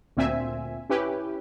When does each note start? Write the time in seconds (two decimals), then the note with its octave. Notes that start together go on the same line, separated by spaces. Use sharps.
0.17 D2 A#2 C4 E5 G#5
0.90 C#4 E4 G4 B4